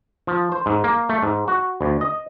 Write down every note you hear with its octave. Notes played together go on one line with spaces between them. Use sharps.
F3
C5
G#2
A#3
A3
G#2
F#4
D2
D#5